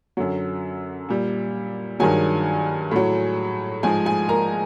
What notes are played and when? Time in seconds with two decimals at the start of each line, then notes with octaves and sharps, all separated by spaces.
0.17 F#2 D3 F#3
1.09 A#2 G3
2.00 G2 D#3 F#3 G#4 G#5
2.91 A2 F#3
3.83 G#2 F3 G#3 G#4 G#5
4.05 G#4 G#5
4.29 A#4 A#5